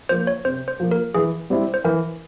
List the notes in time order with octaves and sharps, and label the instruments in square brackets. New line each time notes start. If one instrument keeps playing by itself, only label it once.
[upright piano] F3 A#3 [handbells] C5
[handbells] C#5
[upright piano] C3 [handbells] C5
[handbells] C5
[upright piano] F3 A#3
[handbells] A#4
[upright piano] E3 [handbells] G#4
[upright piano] G3 C4 E4
[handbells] C5
[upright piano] E3 [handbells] A#4